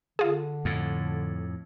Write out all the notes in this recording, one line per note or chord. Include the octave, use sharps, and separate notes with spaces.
D3 F4 G#4
F2 A2